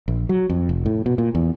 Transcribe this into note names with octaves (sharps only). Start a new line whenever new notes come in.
A#1
F#3
F2
F1
A2
B2
A#2
E2